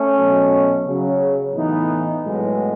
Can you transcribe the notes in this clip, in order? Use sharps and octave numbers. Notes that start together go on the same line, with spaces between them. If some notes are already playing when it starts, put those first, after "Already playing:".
Already playing: A3 C#4
B2 F#3
C#3 F#3
A2 E3 B3 D#4
A2 F#3 G#3 B3